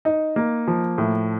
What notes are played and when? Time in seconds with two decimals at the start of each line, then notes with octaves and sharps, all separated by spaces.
0.05 D#4
0.36 A#3
0.67 F3
0.98 A2